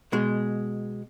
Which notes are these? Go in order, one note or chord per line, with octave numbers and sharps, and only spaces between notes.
B2 G#3